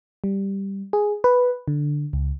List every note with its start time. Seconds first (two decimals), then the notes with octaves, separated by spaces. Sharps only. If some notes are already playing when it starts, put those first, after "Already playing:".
0.24 G3
0.93 G#4
1.24 B4
1.68 D3
2.13 C#2